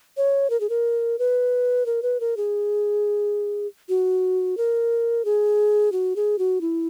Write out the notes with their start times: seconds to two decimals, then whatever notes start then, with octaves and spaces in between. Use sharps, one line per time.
0.17 C#5
0.50 A#4
0.60 G#4
0.70 A#4
1.19 B4
1.86 A#4
2.03 B4
2.20 A#4
2.37 G#4
3.89 F#4
4.57 A#4
5.25 G#4
5.92 F#4
6.16 G#4
6.39 F#4
6.61 E4